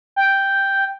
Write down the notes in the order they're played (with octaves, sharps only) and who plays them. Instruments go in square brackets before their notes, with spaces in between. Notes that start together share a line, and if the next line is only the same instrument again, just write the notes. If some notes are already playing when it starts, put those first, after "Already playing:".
[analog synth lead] G5